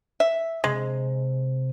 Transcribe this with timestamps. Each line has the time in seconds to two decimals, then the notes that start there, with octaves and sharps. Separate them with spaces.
0.20 E5
0.64 C3 G#3